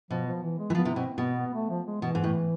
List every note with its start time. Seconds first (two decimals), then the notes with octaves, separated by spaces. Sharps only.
0.11 B2 F3
0.27 F3
0.42 E3
0.58 G#3
0.70 E3
0.75 F3 B3
0.85 C3
0.95 B2 C4
1.17 B2 B3
1.38 B3
1.54 A3
1.70 F3
1.87 G#3
2.02 B2 E3
2.15 G#2
2.24 A2